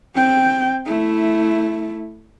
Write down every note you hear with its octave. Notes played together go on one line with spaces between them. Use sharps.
C4 G5
A3 E4